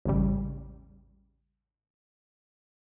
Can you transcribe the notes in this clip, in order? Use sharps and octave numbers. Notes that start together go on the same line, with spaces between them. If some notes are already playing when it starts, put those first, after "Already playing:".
A1 E2 G#2 C#3 G3